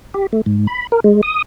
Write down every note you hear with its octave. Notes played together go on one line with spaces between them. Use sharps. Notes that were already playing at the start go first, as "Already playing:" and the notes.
G4
A3
G#2
B5
A#4
G#3
D#6